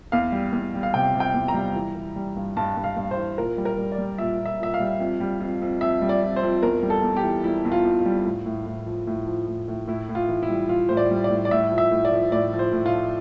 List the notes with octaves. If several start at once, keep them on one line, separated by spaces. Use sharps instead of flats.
E2 F5
G3
E2
G3
F5
C3 G5
C3
G5
E2
A#5
G3
E3
E3
G3
G2
G2 A5
G2
F5
G2
C5
E3
A#2 A#4
G3
A#4
G3
D5
G3
A#2 E5
A#2
E5
A#2 E5
F5
G3
F2
G3
F2
F2
F2 E5
G3
D5
F2
C5
F2
E2 A#4
G3
A4
E2
G4
E3
G3 E4
E2
F4
E2
F4
G3
A2
A2
A2
F3
A2
F3
A2
A2
A2 E4
A2
F4
E3
E4
G3
E3 F4
A2 C5
D5
G3
D5
A2
D5
A2 E5
F3
E5
A2
D5
F3
A2 D5
F3
C5
A2
F4
F3